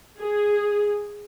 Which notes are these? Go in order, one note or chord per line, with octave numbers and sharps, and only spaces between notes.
G#4